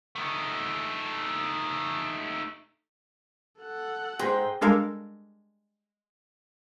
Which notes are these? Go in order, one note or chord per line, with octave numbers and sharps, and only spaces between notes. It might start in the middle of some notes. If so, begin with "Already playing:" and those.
A3 D#4
A4 F#5
G#2 G#4 G5 C6 A#6
G3 G#3 D4 A4 A#4 F5